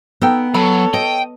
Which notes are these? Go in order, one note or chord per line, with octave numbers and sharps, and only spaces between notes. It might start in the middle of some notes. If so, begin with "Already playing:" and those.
B3 D#4 A4 G5
F#3 A4 C#5 B5
D#5 G5